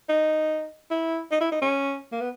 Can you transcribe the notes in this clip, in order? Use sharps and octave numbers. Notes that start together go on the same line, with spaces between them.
D#4
E4
D#4
E4
D#4
C#4
A#3
B3